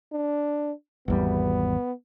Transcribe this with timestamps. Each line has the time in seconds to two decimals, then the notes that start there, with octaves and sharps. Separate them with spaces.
0.13 D4
1.08 G#1 E2 G3 B3